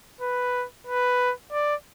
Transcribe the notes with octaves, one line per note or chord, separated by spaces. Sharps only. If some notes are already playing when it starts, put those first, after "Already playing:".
B4
B4
D5